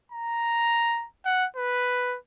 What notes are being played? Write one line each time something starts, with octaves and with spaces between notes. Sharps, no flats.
A#5
F#5
B4